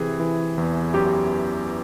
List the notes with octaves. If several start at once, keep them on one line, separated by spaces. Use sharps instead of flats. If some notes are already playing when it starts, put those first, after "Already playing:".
Already playing: C3 E3 G#4
E3
E2
F#2 G4